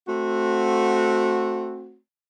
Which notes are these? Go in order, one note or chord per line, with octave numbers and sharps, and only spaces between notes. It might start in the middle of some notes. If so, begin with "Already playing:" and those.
A3 C4 F#4